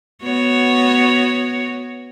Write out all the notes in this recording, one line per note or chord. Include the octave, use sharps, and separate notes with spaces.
B3 F#4 C#5